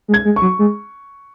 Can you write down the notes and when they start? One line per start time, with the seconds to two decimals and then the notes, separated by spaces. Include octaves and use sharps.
0.08 G#3
0.14 G#6
0.25 G#3
0.36 C#6
0.41 F#3
0.59 G#3